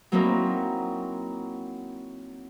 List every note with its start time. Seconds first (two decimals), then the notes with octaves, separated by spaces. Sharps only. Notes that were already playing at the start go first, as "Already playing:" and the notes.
0.12 F#3 A#3 C4 D#4 E4 A#4